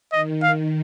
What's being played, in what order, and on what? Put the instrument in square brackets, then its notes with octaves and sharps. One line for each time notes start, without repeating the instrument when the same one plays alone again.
[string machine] D#3 [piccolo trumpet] D#5
[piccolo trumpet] F5